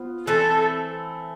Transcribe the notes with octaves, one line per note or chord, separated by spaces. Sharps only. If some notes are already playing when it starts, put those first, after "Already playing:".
Already playing: B3 F4 C5
E3 A3 C4 A4